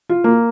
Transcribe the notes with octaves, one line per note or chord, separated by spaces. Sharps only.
F4
A#3